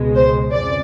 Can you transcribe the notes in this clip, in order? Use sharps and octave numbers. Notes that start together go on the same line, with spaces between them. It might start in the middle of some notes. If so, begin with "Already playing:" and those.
Already playing: C#2 B2 G#3
C5
F2 C#3 F3 G#3 D5